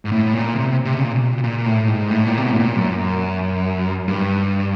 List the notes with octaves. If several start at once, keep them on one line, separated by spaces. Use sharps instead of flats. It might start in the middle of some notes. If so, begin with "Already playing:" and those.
G#2
A2
A#2
C3
C3
C#3
A#2
B2
A#2
A#2
A2
G#2
A2
A#2
C3
B2
A2
A#2
F#2
G2